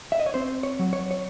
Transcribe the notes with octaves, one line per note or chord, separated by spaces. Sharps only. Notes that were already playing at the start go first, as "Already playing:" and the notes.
E5
D#5
C#5
C4 C5
C#5
F#3
C#5
C#5